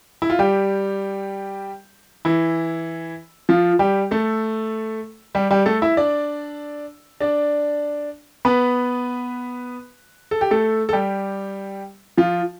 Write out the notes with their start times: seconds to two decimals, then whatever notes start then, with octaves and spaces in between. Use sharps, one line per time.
0.22 E4
0.30 F4
0.39 G3 G4
2.25 E3 E4
3.49 F3 F4
3.79 G3 G4
4.11 A3 A4
5.35 G3 G4
5.51 G3 G4
5.66 A3 A4
5.82 E4 E5
5.97 D4 D5
7.21 D4 D5
8.45 B3 B4
10.31 A4
10.41 G4
10.51 A3 A4
10.89 A4
10.93 G3 G4
12.18 F3 F4